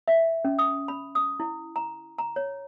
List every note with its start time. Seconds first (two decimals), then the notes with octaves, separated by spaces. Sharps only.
0.08 E5
0.45 C#4
0.59 D#6
0.88 B5
1.15 D#6
1.40 E4
1.76 A#5
2.18 A#5
2.36 C#5